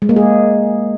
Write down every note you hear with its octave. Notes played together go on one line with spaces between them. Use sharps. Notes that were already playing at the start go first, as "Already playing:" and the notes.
G#3
A#3
G#4